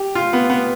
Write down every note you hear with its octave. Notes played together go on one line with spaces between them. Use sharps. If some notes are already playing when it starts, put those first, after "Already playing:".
Already playing: G4
F4
B3
B3